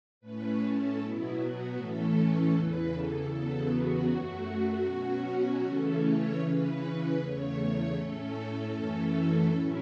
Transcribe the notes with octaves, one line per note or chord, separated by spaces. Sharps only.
A2 A3 C#4 B4
A4
B2 F#3 B3 E4
F#4
A2 E3 A3 C#4 A4
E2 C#3 E3 B4
A4
E2 C#3 F#3 B3 A4
F#4
F#2 F#3 A3 F#4
B2 F#3 C#4
C#3 E3 A3 C#4 A4
C#5
C#3 E3 C#4 B4
E2 C#3 A3 C#5
A2 A3 C#4 A4
F#2 E3 A3 C#4
A2 F#3 C#4 E4